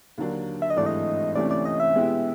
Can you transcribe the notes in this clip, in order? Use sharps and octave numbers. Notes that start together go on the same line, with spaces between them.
D#2 D3 F#3 A#3 D4
E5
D#5
G#1 G2 E3 A3 D5
D#5
D2 C3 E3 A3 C#4 D5
D5
D#5
E5
B2 G#3 B3 E4 G4